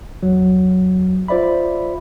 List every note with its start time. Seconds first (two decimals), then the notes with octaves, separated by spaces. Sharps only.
0.23 E2 F#3
1.28 F4 C5 D5 E5 B5